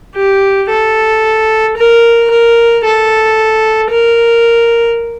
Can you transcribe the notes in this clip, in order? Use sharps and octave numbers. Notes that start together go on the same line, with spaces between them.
G4
A4
A#4
A#4
A4
A#4